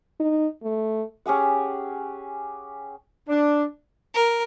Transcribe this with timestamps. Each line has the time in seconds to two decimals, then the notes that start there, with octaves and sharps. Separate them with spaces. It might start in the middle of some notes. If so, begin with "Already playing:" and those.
0.20 D#4
0.63 A3
1.26 C#4 G4 G#4 F#5
3.29 D4
4.14 A#4